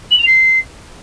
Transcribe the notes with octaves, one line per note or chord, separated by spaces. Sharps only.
F#7
F7
C7